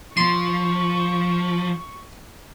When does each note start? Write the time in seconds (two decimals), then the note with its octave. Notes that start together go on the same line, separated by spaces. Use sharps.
0.17 F3 C6 C#6